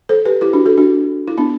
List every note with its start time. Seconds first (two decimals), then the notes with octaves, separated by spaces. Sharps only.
0.09 A4 C5
0.25 G4 B4
0.41 E4 G4
0.53 D4 F#4
0.65 F#4 A4
0.78 D4 F#4
1.28 E4
1.38 B3 D4